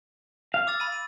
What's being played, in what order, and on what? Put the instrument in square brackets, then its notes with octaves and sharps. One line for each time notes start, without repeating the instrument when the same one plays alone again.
[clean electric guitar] F5
[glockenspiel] D6 E6 A6
B5 A6 D#7
D#7